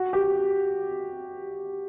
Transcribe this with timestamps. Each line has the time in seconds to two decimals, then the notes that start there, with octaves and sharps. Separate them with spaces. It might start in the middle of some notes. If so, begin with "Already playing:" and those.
Already playing: F#4
0.13 G4